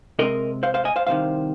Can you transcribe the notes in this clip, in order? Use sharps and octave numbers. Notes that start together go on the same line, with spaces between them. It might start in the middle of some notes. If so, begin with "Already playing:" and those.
C3 G#3 C4 A#4 D#5
C5 F5
C5 F5
D#5 G#5
C5 F5
C2 C3 D#3 C5 F5